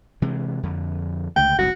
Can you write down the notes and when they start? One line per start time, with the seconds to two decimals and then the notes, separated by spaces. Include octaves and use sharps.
0.22 C3 E3 G#3
0.63 F2 D3
1.36 C#2 D3 A3 G5
1.58 F#1 C2 D3 F#4